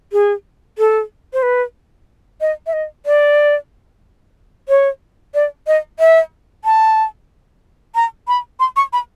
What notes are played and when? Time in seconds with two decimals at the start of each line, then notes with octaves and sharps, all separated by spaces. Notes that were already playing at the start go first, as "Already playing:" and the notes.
0.13 G#4
0.78 A4
1.33 C5
1.43 B4
2.41 D#5
2.67 E5
2.73 D#5
3.06 D5
4.69 C#5
5.34 D5
5.67 D#5
5.99 E5
6.65 A5
7.95 A#5
8.28 B5
8.60 C6
8.76 C#6
8.93 B5